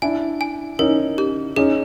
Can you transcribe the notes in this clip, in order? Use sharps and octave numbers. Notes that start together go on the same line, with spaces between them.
D4 E4 G#5
G#5
C#4 D#4 A#4
G4
C#4 D#4 G#4